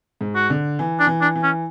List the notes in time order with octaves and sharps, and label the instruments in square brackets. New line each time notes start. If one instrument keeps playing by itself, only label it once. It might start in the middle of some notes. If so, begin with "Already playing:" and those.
[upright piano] G#2
[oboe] F#4
[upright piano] D3
E3
[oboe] D4
[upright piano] E3
[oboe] D4
[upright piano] E3
[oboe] C#4